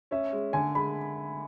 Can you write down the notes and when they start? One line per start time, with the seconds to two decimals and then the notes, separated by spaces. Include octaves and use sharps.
0.11 C#4 E5
0.32 G#3
0.53 D3 G#5
0.75 G#3 B5